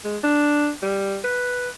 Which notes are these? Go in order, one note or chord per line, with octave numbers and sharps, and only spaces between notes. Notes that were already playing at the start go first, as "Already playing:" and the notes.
G#3
D4
G3
B4